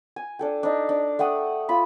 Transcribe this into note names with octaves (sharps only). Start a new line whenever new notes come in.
G#5
D4 A4 G5
D4 D#4
D4
A3 F#5 G5 D#6
F4 B5